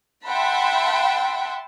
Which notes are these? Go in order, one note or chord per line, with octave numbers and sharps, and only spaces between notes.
E5 F#5 G5 A5 B5 C6